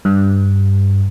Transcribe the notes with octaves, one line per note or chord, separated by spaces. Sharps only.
G2